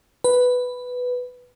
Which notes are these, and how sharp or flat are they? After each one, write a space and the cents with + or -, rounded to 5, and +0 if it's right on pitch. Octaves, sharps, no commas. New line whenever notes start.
B4 +5